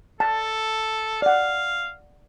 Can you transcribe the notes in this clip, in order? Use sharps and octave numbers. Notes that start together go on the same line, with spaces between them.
A4 A5
D5 F5 F#5